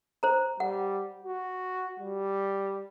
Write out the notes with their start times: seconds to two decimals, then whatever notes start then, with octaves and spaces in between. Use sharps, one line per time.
0.23 C5 A#5
0.60 G3 F#5
1.24 F#4
2.00 G3